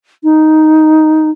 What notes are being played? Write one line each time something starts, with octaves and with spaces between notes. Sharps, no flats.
D#4